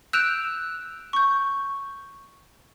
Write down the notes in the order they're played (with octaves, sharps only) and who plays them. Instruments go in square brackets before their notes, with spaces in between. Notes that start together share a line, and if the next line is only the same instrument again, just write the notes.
[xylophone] E6 F#6 G6 D7 E7 F7
C#6 G6